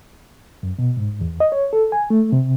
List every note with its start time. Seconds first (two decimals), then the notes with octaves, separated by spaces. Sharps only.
0.63 F#2
0.79 B2
0.97 G#2
1.21 E2
1.40 D#5
1.52 C#5
1.73 A4
1.92 G#5
2.10 A3
2.32 C3